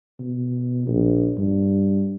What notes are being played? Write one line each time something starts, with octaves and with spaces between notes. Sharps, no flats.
B2
A#1
G2